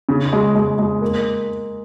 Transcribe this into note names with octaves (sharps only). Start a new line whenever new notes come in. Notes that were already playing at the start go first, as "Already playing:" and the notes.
C#3
G#3
G#3
G#3
A#3